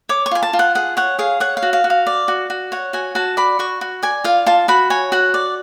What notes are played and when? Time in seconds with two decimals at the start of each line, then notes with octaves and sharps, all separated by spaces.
0.09 C#5 D6
0.26 C#6
0.31 F4 G#5
0.43 A5
0.53 F4
0.59 F#5
0.75 G#4 F#5
0.97 C#5 F#5
1.19 G#4 F5
1.40 C#5 F#5
1.57 F5
1.63 F#4
1.73 F5
1.84 F#4
1.90 F5
2.07 D5
2.28 F#4
2.50 F#4
2.72 C#5 F#5
2.93 F#4 G#5
3.15 F#4 A5
3.37 D5 B5
3.59 F#4 C#6
3.81 F#4
4.03 D5 G#5
4.24 F4 F5
4.46 F4 A5
4.68 F#4 B5
4.90 C#5 G#5
5.12 F#4 F#5
5.34 D5